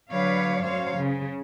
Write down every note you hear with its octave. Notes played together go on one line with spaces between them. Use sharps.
D3 F#3 B4 C#5 D5 F5
F#2 F#3 C5 C#5 F5
C#3